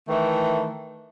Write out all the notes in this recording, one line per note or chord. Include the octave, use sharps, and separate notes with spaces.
D#3 E3 A3